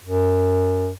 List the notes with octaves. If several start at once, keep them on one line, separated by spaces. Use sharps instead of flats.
F#2